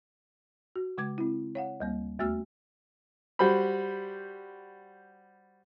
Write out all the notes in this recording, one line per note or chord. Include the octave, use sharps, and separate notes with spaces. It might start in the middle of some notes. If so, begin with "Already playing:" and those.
F#4
C#3 G#3 D6 G#6
C4 E4
C#5 F5 F#5
D2 G3 A#3
D#2 A3 B3 F#4 E6 F6
G3 F#4 C5 B5